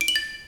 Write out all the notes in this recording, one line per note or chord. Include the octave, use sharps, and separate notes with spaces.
D7
F#7
A6